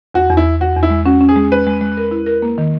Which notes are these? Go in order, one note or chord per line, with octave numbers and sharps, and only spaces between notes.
E2 F#4
E2
E4
E2
E2 F#4
E2
E4
G#3
C#4 F#4
C#4
G#4
G#3
G#3 B4
G#3
G#3
A#4
E4
A#4
A#3
D#3